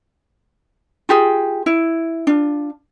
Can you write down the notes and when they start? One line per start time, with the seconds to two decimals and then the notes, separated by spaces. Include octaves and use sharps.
1.09 F4 G4 G#4
1.66 E4
2.27 D4 F4